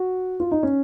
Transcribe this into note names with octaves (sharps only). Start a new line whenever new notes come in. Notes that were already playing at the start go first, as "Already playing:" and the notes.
Already playing: F#4
F4
D#4
C#4